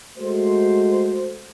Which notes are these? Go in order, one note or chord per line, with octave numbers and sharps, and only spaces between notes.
G#3 A3 F#4 C5